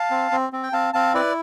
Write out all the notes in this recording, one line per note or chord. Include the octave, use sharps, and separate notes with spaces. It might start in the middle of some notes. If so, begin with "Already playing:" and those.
Already playing: F5 A5
C4
C4
C4
G5
C4 F5 A5
C4 F5 A5
E4 B4 D5